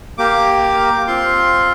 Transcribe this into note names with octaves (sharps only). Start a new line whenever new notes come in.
A#3 G4 D6
D6
C4 F4 C6